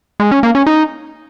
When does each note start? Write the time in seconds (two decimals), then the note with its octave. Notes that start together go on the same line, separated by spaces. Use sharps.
0.20 G#3
0.31 C#4
0.43 A#3
0.55 C#4
0.67 D#4